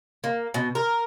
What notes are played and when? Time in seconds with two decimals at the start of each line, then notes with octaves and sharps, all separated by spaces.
0.24 A#3
0.54 B2
0.75 A#4